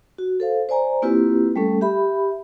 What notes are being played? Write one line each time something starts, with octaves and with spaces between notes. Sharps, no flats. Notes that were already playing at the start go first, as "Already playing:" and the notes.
F#4
A4 C5 F5
C5 D5 G#5 A#5
A#3 C4 E4 F4 G4 B4
G3 A3 C#4 A4
G4 E5 B5